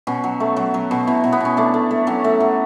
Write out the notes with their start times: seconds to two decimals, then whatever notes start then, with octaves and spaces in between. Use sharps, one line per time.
0.07 B2 C#4
0.24 F#3
0.40 A3
0.56 F#3
0.74 F#3
0.91 B2
1.07 B2 E4
1.24 B2
1.32 B3
1.40 B2 C#4
1.57 A3 D4
1.74 A3
1.91 A3
2.07 F#3 C#4
2.24 A3
2.40 F#3